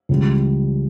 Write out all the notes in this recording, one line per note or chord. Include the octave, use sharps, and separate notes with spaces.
C#2 C#3 E3 G3